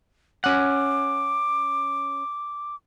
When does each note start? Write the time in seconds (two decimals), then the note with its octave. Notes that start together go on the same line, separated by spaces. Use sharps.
0.44 C#4 F#5 D6